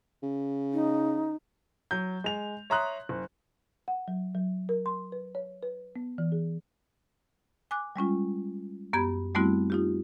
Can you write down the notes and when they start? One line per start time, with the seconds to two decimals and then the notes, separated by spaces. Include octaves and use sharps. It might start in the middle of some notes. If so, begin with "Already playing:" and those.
0.23 C#3
0.73 D#4
1.91 F#3 G6
2.24 G#3 F7
2.70 C#5 E5 A#5 C6 D#6 F#6
3.09 F#1
3.88 F#5
4.08 F#3
4.35 F#3
4.69 A#4
4.86 C6
5.12 B4
5.35 C#5
5.63 B4
5.96 B3
6.18 E3
6.32 G#4
7.71 G#5 D6 F#6
7.96 G3 G#3 C#4 F4
8.93 F#2 B3 G4 B5 G#6
9.35 G3 A3 B3 C4 E4 F#4
9.70 D#4 F4 G4